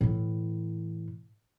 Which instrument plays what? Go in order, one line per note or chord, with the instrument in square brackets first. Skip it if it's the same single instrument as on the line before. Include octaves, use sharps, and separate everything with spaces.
[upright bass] A2 E3